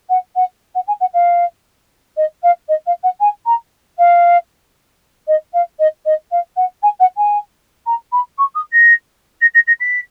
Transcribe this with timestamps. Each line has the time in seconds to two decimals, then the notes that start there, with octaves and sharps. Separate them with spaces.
0.09 F#5
0.35 F#5
0.75 F#5
0.87 G#5
1.00 F#5
1.13 F5
2.16 D#5
2.42 F5
2.68 D#5
2.86 F5
3.03 F#5
3.20 G#5
3.45 A#5
3.98 F5
5.27 D#5
5.53 F5
5.79 D#5
6.05 D#5
6.31 F5
6.56 F#5
6.82 G#5
7.00 F#5
7.17 G#5
7.86 A#5
8.12 B5
8.38 C#6
8.55 D#6
8.72 A#6
9.41 A#6
9.54 A#6
9.67 A#6
9.80 B6